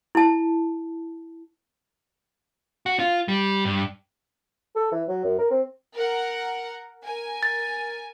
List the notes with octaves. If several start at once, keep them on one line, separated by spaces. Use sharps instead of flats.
E4 A5
F#4
F4
G3
G2
A4
E3
F#3
F#2
A#4
C4
A#4 F#5
A#4 G#5
A6